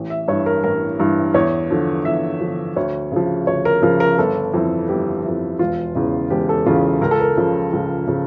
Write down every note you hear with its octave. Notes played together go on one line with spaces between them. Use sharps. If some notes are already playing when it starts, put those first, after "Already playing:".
Already playing: A1
E5
G2 E3 C#5
A#4
A1 A#4
G2 E3
E2 C#5
D3 F3
E2 E5
D3 F3
D2 C#5
C#3 F3
D2 C#5
A#4
C#3 F3 A#4
A#4
G1 A4
F2 E3
G1 G4
F2 E3
E1 F4
E2 C#3
E1 G4
A4
E2 C#3 F4
C#2 A#4
A4
A#4
C#3 F3
C#2
C#3 F3